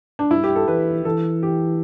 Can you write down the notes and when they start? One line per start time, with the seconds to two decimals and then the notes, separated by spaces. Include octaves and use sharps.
0.19 D4
0.31 G2 E4
0.44 G4
0.56 A4
0.68 E3 B4
1.05 E3 A4
1.43 G4